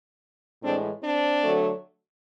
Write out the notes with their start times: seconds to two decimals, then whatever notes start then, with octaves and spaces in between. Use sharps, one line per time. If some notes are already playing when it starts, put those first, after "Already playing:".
0.62 A2 E3 G#3 C4 D4
1.02 C4 D4
1.42 D3 F#3 A3